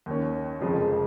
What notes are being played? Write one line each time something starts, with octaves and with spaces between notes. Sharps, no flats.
D#2 D#3 C#4
F1 F2 C#3 F3 G#3